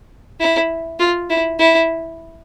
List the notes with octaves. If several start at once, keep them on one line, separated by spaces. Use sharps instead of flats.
E4
F4
E4
E4